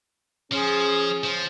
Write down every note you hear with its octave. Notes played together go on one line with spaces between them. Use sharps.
F3 C#4 G#4
F3